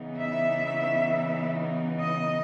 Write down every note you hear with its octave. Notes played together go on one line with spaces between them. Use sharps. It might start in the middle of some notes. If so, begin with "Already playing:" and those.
Already playing: C#3 E3 B3 D#4
E5
D#5